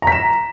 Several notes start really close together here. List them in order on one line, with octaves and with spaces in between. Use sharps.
A#5 B6 E7